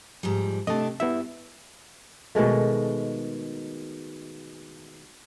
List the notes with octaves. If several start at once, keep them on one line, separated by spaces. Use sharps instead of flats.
G#2 F3 G3
C3 A3 D4 D#5 A5
G2 B3 E4 E5
B2 D#3 G#3 A3